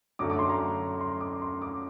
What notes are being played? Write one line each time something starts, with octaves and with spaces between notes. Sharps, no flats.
F#2 D3 F#3 A3 D6
D6
C6
A#5
C6
D6
C6
D6